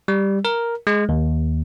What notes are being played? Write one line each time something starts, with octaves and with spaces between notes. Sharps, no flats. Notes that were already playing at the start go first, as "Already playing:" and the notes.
G3
A#4
G#3
D#2